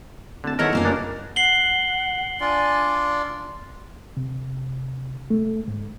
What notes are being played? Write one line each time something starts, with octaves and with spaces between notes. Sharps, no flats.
D1 D3 A5
E2 D#3 D#4 A4 A#4 C#5 E5 F#5
F#2 A#2 A#3 C#4
A1 C#3 D4 A#4
F#5 C7 F#7 G7
D4 F4 D5 G#5
C3
A3
G#2